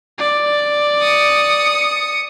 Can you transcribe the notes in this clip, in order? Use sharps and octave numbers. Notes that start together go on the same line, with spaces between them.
D5
D#6 C#7